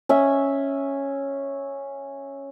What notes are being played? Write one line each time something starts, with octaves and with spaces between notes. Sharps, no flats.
C#4 E5